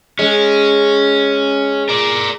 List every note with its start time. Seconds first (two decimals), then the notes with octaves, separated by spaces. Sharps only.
0.19 G#3 C#4
1.89 A#4 D5